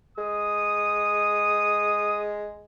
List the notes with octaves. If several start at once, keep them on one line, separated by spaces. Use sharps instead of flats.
G#3 D#6